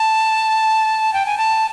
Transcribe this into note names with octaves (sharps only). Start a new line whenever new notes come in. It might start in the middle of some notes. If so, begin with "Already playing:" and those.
Already playing: A5
G5
G#5
A5